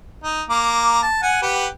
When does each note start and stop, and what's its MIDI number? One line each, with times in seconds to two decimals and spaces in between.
0.24 0.42 63
0.50 1.02 58
0.50 1.02 82
0.50 1.02 86
1.02 1.23 81
1.23 1.42 78
1.23 1.42 80
1.42 1.67 67
1.42 1.67 71
1.42 1.67 78